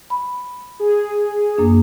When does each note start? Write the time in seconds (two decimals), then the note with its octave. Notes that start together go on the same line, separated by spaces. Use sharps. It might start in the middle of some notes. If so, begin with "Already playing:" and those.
0.10 B5
0.80 G#4
1.58 F#2 A#3 D4